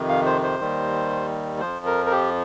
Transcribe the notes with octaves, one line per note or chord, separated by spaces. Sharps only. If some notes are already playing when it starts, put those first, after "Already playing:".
Already playing: F2 C3 D#3
F5
C5
C5
D#2 D#3 G3
F2 F3 C5
A#4
A#4
G4